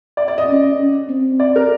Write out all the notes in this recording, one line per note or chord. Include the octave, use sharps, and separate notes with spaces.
D5
D5
D#5
C#4
C#4
C4
D5
A#4